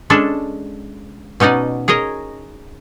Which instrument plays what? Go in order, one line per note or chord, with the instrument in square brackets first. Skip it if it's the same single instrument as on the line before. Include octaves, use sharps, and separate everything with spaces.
[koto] G#3 C#4 D4 A4
B2 C#4 D#4 D5 F#5
G#4 A#4 C#5 D#5